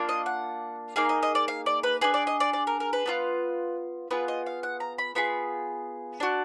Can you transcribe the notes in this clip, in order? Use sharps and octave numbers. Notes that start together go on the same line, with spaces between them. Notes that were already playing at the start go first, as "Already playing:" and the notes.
Already playing: A#3 D4 F4
D#5
F#5
A#3 D#4 G#4 F5
D#5
D#5
D5
F5
D5
B4
D4 G#4 B4
D5
D#5
D5
D5
A#4
A#4
B4
B3 D4 F4
B3 F4 G#4 B4
D#5
F5
F#5
A#5
B5
B3 F4 G#4 B5
D4 F#4